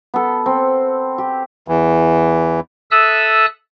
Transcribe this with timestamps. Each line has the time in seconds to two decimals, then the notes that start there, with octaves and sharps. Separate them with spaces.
0.14 B3 A4
0.46 C4
1.18 G4
1.68 E2 E3
2.91 A4 E5 D#6 E6 F#6